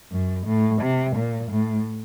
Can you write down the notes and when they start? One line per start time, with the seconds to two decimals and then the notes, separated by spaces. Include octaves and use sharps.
0.12 F#2
0.46 A2
0.82 C3
1.16 A#2
1.51 A2